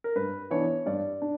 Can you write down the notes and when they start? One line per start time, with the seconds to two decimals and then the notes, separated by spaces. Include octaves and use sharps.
0.04 A#4
0.15 G2 B4
0.51 E3 B3 D4 C#5
0.86 G2 D5
1.22 D4